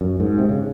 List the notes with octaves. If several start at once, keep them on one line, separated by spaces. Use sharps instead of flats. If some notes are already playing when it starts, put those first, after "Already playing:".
F#2
G#2
C3
C#3